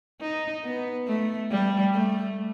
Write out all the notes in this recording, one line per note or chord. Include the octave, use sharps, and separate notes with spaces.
D#4
B3
A3
G3
A3